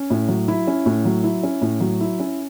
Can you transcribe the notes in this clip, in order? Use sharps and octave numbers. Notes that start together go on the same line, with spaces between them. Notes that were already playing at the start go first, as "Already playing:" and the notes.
Already playing: C#4
A2
F#3
E4
C#4
A2
F#3
E4
C#4
A2
F#3
E4
C#4